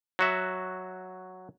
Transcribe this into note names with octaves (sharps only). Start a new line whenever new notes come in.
F#3 F#4 E5